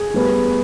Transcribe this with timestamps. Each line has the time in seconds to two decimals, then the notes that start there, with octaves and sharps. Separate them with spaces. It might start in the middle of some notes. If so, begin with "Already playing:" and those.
Already playing: G#4
0.14 G3 B3